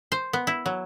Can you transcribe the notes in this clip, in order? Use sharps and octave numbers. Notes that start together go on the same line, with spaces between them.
C5
B3
E4
F#3